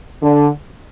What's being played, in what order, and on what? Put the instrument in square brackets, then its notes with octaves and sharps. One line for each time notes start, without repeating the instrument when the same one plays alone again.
[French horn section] D3